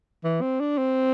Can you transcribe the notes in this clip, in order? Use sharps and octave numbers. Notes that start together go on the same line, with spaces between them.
E3
C4
D4
C4